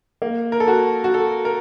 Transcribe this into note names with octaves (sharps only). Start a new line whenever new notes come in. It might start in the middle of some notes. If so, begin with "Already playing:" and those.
A#3
A#4
A4
F#4
F#4
A4
A#4